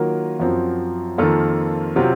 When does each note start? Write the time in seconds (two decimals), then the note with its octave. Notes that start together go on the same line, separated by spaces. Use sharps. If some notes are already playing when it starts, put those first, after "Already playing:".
Already playing: D#3 F#3 A#3 F4 A#4
0.40 F#2 F3 C4 F#4
1.18 F2 D#3 A#3 F4 A4
1.96 C3 F#3 C4 F4